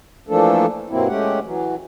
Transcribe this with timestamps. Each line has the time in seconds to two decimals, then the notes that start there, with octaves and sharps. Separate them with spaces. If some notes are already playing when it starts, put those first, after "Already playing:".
0.29 E3 F3 A3 A#3 D4 A4
0.90 G2 B2 F#3 A#3 C4 E4
1.07 G#3 A3 C#4 G4 F#5
1.44 E3 F#3